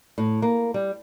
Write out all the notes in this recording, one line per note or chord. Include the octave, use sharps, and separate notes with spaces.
A2
A#3
G3